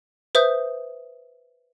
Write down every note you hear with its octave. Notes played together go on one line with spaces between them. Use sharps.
B4 C5 E5 D#6 G6